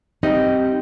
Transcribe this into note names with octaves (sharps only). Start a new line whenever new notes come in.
G3 C4 D#4 D#5